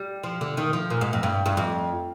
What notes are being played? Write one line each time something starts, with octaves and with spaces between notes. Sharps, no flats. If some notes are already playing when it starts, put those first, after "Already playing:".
Already playing: G3
F3
D3
D#3
F3
A#2
G#2
F2
G2
G2
F2